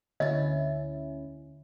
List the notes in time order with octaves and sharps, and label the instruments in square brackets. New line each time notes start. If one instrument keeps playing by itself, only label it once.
[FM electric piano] D2 C#4 E4 [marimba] D3 A6 [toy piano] D#5